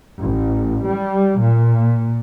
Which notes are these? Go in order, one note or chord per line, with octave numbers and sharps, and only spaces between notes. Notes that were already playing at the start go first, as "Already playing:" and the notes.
A1
G3
A#2